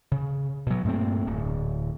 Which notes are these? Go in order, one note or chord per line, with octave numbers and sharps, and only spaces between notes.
C#3
B2 F#3
G2 A#2 A3 C4
D1